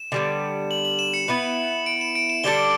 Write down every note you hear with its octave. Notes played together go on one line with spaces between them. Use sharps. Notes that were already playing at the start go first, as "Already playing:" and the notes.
Already playing: E7
D3 G3 B3
F#7
F#7
E7
C#7
B3 E4 B4
D7
E7
D7
E7
D3 G3 D4 A4 G7